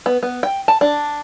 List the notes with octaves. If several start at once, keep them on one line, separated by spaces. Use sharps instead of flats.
B3
B3
G5
A5
D4